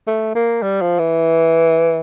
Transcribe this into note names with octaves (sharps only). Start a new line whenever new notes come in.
A3
A#3
G3
F3
E3